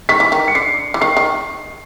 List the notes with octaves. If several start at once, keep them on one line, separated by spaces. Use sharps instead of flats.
D#3 B6
E3
D#3
C#7
D3 C7
E3
D#3 C7
D#3